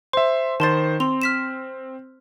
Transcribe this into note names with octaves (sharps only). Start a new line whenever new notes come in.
C5 E5 C6
D#3 C5 A5 C6 A6
C4 C6 F7
F6 B6 E7